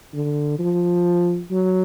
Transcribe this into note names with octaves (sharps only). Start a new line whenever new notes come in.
D3
F3
F#3